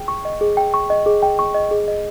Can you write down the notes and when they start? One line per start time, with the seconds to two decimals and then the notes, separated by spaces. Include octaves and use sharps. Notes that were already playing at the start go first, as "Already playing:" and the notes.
Already playing: G#4 G5
0.08 C#6
0.25 D#5
0.41 G#4
0.57 G5
0.74 C#6
0.90 D#5
1.06 G#4
1.23 G5
1.39 C#6
1.54 D#5
1.71 G#4
1.88 D#5